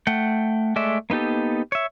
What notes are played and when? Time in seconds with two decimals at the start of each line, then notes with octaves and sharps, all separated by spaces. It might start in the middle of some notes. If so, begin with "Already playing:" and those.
0.07 A3 F#5 G5
0.76 G#3 A3 D5 E5
1.10 A#3 B3 D#4 G4 A4
1.72 C#5 E5